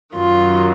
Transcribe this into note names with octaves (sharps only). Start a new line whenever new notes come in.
F#2 D#3 F#3 F4